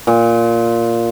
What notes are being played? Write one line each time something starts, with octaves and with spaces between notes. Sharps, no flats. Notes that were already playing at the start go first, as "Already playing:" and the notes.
A#2